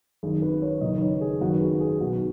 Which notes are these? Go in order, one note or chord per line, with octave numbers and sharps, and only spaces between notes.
G#1 F#2 D#3 G#4
B4
C#5
F#1 F#2 D#3 D#5
B4
C#5
G#4
G#1 F#2 D#3 F#4
B4
G#4
G#4
B1 B2 F#4